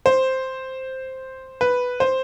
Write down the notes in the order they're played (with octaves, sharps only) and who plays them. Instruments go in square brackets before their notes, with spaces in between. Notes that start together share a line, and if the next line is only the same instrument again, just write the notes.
[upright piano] C5
B4
C5